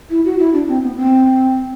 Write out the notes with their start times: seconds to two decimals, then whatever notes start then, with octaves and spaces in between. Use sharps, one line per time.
0.10 E4
0.25 F#4
0.39 E4
0.53 D4
0.68 C4
0.83 B3
0.97 C4